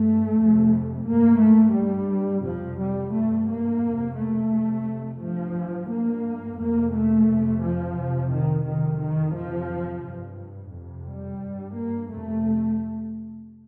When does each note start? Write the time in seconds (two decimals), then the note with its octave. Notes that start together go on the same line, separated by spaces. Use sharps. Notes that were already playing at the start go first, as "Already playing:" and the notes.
Already playing: G2 A3
0.38 F2 C3
1.08 G2 A#3
1.42 A3
1.76 G2 G3
2.45 F2 C3 F3
2.80 G3
3.14 G2 A3
3.49 A#3
3.83 F2 C3
4.18 A3
4.52 F2 C3
5.21 G2 F3
5.90 G2 A#3
6.59 F2 C3 A#3
6.93 A3
7.28 F2 C3
7.63 F3
7.97 F2 C3
8.32 D#3
8.66 F2 C3 D#3
9.00 D#3
9.35 F2 C3 F3
10.04 G2
10.73 F2 C3
11.07 G3
11.42 G2
11.76 A#3
12.11 F2 C3 A3